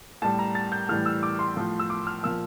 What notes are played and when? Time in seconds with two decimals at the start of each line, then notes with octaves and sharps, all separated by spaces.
0.22 A2 G3 A5
0.39 A#5
0.55 A6
0.72 G6
0.89 A2 E3 G3 F6
1.06 E6
1.23 D6
1.39 C6
1.56 A2 F3
1.79 E6
1.90 D6
2.07 F6
2.23 A#2 F3 E6